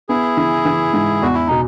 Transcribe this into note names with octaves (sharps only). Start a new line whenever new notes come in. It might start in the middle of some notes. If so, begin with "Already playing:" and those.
B3 E4 G#4
E3
E3
G#2
E2 F#4
E4
B2 D#4